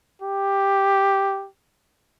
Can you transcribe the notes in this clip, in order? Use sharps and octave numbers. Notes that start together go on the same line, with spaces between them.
G4